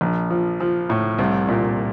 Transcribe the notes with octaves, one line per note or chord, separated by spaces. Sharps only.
A#1
F3
F3
A2
C2
A#2